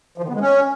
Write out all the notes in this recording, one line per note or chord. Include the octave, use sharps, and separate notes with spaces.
F3
D#3
B3
G#3
C#4